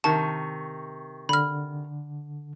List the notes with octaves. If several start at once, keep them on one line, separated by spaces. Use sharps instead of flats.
C3 D#3 A5 C#6
D3 B5 F6